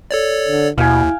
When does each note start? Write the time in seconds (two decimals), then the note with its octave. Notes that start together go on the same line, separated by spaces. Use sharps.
0.11 A4 C#5 D5
0.48 D3
0.78 D#2 B2 E4 F5 G5 G#5